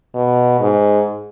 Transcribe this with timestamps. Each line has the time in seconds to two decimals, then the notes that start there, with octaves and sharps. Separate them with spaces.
0.15 B2
0.60 G#2